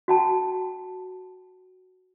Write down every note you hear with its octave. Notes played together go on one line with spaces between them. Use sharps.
F#4 G5 A5